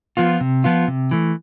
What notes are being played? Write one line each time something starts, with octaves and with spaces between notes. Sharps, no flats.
F3 B3 F4
C3
F3 B3 F4
C3
E3 A3